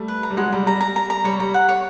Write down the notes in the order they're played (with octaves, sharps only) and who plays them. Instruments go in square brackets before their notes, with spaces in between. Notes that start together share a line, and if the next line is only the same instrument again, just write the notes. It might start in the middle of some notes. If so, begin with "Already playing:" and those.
Already playing: [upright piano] G3 A3
[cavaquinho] B4
A#5
[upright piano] G3
[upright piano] F#3 G#3 [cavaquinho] F#5
[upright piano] G3 [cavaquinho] A#5
[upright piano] G3 [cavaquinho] A#5
[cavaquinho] A#5
A#5
A#5
[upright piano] G3 [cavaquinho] C#5
[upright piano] G3 [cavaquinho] A#5
[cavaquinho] F#5
C#5